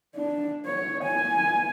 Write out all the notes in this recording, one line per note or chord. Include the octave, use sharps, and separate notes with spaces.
D4
C#5
G#5